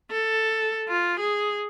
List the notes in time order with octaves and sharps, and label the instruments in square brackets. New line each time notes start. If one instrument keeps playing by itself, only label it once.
[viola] A4
F4
G#4